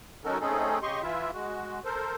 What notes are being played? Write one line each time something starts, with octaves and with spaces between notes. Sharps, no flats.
F#3 C#4 D#4 F#4 A4 A#4
A3 C4 C#4 D#4 G#4 A4
C#3 G4 D#5 C6 C#6
E3 E4 F4 E5
G#3 F#4
A4 A#4 C5